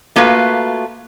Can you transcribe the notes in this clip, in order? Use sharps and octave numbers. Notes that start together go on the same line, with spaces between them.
A3 A#3 F4 F#4 B4